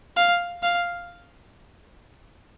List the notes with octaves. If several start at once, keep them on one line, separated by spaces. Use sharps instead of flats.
F5
F5